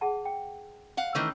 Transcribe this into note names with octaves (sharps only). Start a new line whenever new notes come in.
G#4 F#5 A5
G5
F5 F#5
D#3 E3 A3 C#4 C#5